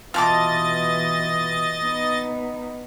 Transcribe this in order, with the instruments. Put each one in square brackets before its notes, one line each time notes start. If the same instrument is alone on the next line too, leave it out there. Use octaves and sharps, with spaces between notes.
[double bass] B2 E3 [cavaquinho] F4 A5 D6 [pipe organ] D#5 A6
[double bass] B3 D#4